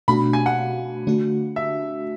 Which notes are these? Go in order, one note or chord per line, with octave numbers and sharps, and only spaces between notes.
B2 A3 D4 F#4 B5
G#5
F#5
D3 A3 D4 F#4
E5